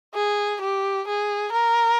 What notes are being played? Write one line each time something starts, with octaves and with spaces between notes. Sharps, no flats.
G#4
G4
G#4
A#4